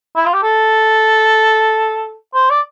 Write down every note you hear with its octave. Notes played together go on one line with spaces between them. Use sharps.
E4
F4
G4
A4
C5
D5